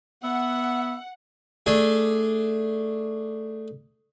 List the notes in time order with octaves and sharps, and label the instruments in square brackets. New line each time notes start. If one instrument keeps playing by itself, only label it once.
[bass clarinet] B3 [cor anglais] E5 [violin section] F#5
[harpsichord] A3 D4 G#4